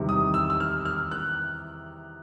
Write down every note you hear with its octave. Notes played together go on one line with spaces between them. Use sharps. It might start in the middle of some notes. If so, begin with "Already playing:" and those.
Already playing: E2 C3 D#3 G3
D#6
E6
E6
F6
F6
F#6